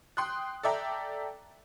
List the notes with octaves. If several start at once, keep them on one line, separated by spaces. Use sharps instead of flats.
G5 C6 D#6 F#6
A4 D5 E5 G5 A#5